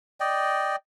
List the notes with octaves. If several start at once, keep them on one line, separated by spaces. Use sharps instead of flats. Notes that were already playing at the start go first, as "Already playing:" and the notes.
D5 D#5 G5